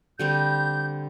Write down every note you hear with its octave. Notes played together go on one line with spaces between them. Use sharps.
D3 G3 C4 G6